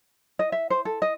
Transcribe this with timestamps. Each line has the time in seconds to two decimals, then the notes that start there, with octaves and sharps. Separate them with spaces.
0.39 D#5
0.52 E5
0.70 C5
0.85 A4
1.02 D#5